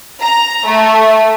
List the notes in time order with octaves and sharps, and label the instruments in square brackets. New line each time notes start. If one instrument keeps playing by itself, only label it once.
[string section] A#5
A3